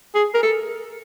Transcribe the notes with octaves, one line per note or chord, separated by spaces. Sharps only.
G#4
A#4
A4